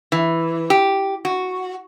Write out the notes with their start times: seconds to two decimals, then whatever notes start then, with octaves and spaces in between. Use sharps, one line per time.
0.12 E3
0.70 G4
1.25 F#4